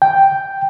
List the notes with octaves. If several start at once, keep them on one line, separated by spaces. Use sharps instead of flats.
G5